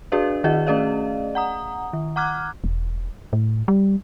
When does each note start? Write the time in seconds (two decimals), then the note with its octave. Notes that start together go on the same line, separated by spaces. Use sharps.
0.12 D4 F#4 G#4 B4 D5 F5
0.44 D#3 F#4 G#4 D#5 F#5
0.67 A3 C#4 G#4 D5 D#5 F5
1.35 F#5 A#5 D#6
1.93 D#3
2.16 F#5 A#5 D6 F6 F#6 G#6
2.64 E1
3.33 A2
3.68 G3